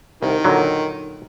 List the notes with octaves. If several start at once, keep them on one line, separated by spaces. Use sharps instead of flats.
C2 D#3
A#2 D3 F#3